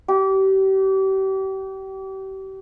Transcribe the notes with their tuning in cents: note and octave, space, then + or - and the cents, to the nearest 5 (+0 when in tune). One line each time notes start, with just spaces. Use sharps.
G4 -35